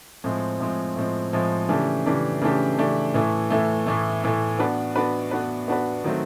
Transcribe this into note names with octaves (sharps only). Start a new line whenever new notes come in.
A2 F3 G#3 C4
A2 F3 G#3 C4
A2 F3 G#3 C4
A2 F3 G#3 C4
C#3 E3 A3 D4 G4
C#3 E3 A3 D4 G4
C#3 E3 A3 D4 G4
C#3 E3 A3 D4 G4
A2 E3 A3
A2 E3 A3
A2 E3 A3
A2 E3 A3
B3 D4 F#4 B4
B3 D4 F#4 B4
B3 D4 F#4 B4
B3 D4 F#4 B4
D#3 F#3 A3 C4